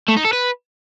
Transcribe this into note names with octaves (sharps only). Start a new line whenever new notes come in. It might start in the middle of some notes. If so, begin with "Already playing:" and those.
A3
D#4
A4
B4